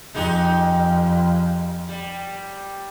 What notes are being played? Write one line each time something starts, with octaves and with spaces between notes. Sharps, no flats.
F2 G#3 D#4 G4
G3